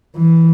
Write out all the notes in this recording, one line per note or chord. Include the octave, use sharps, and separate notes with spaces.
E3